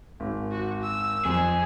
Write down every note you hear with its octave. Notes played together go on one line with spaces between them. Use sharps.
G#1
F#4
E6
F2 G#4